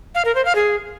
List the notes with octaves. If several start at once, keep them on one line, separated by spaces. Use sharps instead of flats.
F5
A#4
C5
F5
G#4